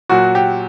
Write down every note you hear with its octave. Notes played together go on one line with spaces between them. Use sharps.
A#2 F#3 F#4
G4